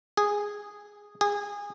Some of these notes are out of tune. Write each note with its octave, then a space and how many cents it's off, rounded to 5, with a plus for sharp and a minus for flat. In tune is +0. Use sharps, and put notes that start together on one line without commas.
G#4 -10
G#4 -25